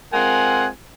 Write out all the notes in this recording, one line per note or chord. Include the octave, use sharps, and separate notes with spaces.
G#3 C4 F4 A#4 F#5 G#5